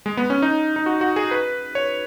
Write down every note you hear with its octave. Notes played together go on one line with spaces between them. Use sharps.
G#3
B3
C#4
D#4
D#4
F#4
F#4
G#4
B4
C#5